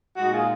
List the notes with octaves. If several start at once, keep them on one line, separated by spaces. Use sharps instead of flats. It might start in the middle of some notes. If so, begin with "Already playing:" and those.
A#2 G#3 D#4 F#4
F4 G#4